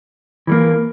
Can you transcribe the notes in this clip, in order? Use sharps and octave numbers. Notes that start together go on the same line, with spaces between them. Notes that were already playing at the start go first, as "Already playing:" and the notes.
E3 G3 A#3